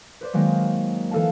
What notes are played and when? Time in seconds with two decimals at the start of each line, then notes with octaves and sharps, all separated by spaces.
0.21 B4 C5 D5
0.34 D#3 F#3 G#3 A#3
1.11 E3 A4 F5 A5